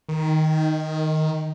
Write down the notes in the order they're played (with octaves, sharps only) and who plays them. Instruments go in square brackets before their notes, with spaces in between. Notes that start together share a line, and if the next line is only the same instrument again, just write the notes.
[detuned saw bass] D#3